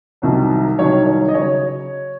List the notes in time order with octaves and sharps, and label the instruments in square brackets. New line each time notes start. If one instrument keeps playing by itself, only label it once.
[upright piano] C2 C3 D#3 F#3
C2 C3 D#3 F#3 C#5
C#5
D#5
C#3 F#3 C#5